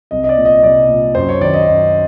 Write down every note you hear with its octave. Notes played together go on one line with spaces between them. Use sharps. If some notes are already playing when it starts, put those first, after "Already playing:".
C2 D#5
D#5
D5
A#2
D#5
C2 D5
A#2
F#2 C5
C#5
D#3 D5
D#5
F#2